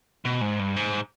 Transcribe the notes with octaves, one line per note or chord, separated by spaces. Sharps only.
B2
G#2
G2
G#2